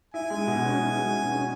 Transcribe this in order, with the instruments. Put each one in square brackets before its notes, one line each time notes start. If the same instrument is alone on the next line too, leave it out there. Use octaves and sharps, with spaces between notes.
[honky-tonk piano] E4 [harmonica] G#5
[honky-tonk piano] G#3
B2
C#4
E4
G#3
B2
C#4